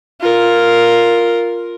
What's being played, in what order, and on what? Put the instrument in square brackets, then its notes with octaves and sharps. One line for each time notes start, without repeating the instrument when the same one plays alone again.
[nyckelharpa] F4 A#4